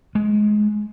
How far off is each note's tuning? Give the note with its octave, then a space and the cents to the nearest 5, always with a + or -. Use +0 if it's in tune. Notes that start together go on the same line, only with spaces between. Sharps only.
G#3 +15